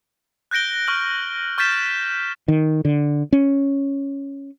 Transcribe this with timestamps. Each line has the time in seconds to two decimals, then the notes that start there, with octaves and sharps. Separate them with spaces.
0.51 F#6 G6 A#6 D7 G7
0.87 C#6 F6 F#7
1.58 C#6 F6 G6 A6 B6 E7
2.48 D#3
2.85 D3
3.33 C#4